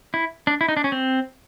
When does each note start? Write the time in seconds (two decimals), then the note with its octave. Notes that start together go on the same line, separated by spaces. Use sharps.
0.14 E4
0.47 D4
0.61 E4
0.68 D#4
0.77 D4
0.84 C#4
0.92 C4